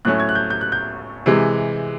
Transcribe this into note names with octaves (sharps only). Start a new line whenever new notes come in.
A2 F#3 A3 C#4 F#6
G#6
F#6
G6
G6
F#6
G6
C3 E3 G#3